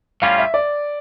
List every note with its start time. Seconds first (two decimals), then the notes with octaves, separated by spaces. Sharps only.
0.22 A2 G3 C#4 F4 F5
0.38 E5
0.54 D5